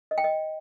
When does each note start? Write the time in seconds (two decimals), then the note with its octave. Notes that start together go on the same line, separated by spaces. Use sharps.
0.11 D#5
0.18 G5
0.24 D#5